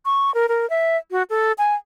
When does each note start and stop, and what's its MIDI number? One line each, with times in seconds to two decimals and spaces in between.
0.05 0.33 85
0.34 0.46 70
0.49 0.69 70
0.70 0.97 76
1.11 1.23 66
1.30 1.52 69
1.58 1.75 80